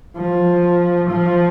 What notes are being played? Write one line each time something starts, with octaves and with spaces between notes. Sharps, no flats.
F3
F3